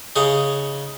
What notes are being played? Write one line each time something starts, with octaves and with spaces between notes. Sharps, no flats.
C#3 C#4 D#4 G#4